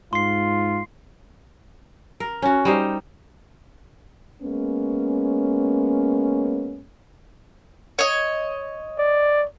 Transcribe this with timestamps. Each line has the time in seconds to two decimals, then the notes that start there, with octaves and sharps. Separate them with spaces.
0.13 G#2 F4 C6 C7
2.20 A#4
2.42 C#4 F#4
2.65 G3 D#4 C5
4.42 G#3 A#3 B3 C#4
7.99 C#5 D#5
8.99 D5